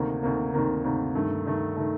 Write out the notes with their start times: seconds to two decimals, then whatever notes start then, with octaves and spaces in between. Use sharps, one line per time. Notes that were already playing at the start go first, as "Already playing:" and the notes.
Already playing: D2 C3 D#3 A#3
0.23 D2 C3 D#3 A#3
0.53 D2 C3 D#3 A#3
0.84 D2 C3 D#3 A#3
1.15 G2 D#3 A3
1.45 G2 D#3 A3
1.76 D#3 A3